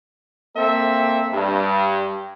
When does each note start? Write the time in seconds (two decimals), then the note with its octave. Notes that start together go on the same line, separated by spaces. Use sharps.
0.56 A#3 C4 A4 E5
1.32 G2